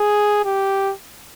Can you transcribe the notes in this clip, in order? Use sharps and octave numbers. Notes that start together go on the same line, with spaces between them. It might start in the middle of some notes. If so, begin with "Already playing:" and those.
Already playing: G#4
G4